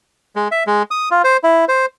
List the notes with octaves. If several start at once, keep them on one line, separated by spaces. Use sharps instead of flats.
G#3
E5
G#3
D#6
F4
C5
E4
C5